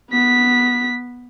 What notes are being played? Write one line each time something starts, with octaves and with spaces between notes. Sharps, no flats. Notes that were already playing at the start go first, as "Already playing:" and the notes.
B3 B6